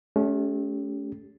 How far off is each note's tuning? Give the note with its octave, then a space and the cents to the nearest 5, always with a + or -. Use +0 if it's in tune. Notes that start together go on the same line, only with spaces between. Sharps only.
A3 -30 C#4 +25 G4 +0